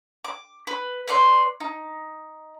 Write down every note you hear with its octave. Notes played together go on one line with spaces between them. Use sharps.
D6
B4
B4 C#5 D5 C6
D#4